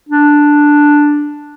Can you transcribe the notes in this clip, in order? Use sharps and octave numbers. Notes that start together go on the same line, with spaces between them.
D4